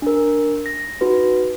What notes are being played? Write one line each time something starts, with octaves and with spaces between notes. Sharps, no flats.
D4 A#4
A#6
D#4 F#4 B4